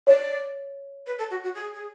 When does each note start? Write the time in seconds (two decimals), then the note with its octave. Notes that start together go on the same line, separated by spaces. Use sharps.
0.07 C#5 D5
1.07 B4
1.19 A4
1.31 F#4
1.44 F#4
1.55 G#4
1.74 G#4